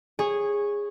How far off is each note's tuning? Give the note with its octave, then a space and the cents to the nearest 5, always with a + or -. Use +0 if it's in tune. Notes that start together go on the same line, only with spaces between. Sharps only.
G#4 -15 C#5 -10